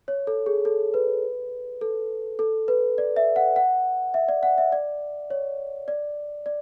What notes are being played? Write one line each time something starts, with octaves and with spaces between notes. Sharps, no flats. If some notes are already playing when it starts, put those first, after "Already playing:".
C#5
A4
G#4
A4
B4
A4
A4
B4
D5
E5
F#5
F#5
E5
D5
F#5
E5
D5
C#5
D5
D5